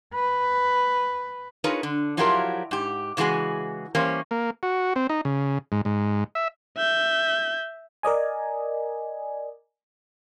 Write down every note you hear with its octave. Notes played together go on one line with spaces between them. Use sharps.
B4
D#4 F4 G#4 A#4 B4 C#5
D3
F3 F#3 E4 F4 G4 A#4
G#2 G4
C#3 E3 G#3 F#4 G#4
E3 G3 A#3 C#4 G4 C5
A#3
F#4
C4
D#4
C#3
G#2
G#2
E5
E5 G6
A#4 D5 D#5 G#5